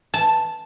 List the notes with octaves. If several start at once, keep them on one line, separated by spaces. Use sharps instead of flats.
A5